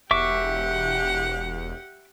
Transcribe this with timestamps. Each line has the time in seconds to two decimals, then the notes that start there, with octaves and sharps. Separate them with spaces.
0.11 E1 G4 E5 F#5 C#6 D6